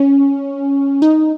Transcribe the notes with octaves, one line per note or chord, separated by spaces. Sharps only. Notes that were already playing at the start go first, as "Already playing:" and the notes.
Already playing: C#4
D#4